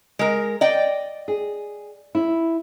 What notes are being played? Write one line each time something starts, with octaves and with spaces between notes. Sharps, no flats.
G#3 A#4
D5 D#5 G5
G#4
E4